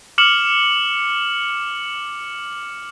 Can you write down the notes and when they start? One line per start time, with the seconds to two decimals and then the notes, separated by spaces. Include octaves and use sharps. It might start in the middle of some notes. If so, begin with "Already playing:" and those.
0.18 D6 F6 C#7 E7 F#7